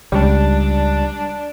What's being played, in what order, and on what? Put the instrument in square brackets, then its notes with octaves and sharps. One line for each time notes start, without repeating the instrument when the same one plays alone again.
[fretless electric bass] C#2 [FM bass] G3 [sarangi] D4